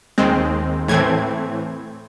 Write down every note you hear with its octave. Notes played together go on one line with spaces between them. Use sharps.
D#2 D#3 G#3 C4
A2 E3 A3 C4 G#6